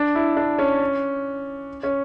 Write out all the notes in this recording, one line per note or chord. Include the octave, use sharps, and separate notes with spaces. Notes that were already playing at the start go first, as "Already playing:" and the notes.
Already playing: D4
E4
D4
C#4
C#4